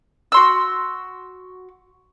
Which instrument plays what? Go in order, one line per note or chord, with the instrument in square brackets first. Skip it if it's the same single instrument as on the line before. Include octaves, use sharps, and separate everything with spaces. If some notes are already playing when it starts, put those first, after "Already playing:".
[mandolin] F#4 C6 E6